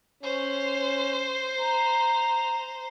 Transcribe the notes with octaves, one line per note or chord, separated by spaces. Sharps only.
C#4 C5
A#5